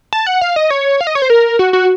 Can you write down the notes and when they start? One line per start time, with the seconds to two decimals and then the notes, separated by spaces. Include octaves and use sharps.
0.13 A5
0.26 F#5
0.41 F5
0.56 D#5
0.70 C#5
1.01 F5
1.07 D#5
1.15 C#5
1.22 C5
1.30 A#4
1.59 F#4
1.73 F#4